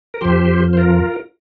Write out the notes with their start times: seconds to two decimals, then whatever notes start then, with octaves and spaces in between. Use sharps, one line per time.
0.14 A#4
0.21 F2 F3 G4 C5
0.73 C5
0.77 F4 A#4